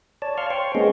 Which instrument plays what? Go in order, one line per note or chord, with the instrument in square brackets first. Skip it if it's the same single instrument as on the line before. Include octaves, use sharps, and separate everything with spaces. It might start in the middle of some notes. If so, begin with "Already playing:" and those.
[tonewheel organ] C#5 D5 A5
F5 A5 C6 C#6 F6
C5 C#5 G5 C6 C#6
G#3 A#3 B3 C#4 G#4 D#5